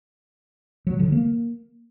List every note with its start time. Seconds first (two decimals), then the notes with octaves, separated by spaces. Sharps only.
0.87 F#3
0.93 B2
0.99 D3
1.06 F3
1.12 A#3